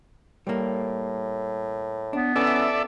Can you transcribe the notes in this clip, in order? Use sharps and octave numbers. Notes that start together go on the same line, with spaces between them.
A2 G3 A#3
B3 D4
E3 C#4 A4 D5 E5